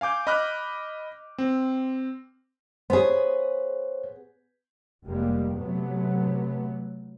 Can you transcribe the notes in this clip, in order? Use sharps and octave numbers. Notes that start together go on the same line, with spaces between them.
F5 G#5 D6 G6
D#5 B5 D6 F6 F#6
C4
B3 G#4 C5 C#5
F1 G3 G#3 A#3
C3 F#3 A3 B3